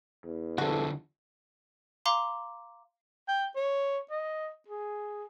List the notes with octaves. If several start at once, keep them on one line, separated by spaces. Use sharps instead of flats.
E2
C2 D3 F3 D4 F#4 A4
F5 A#5 C6 D6
G5
C#5
D#5
G#4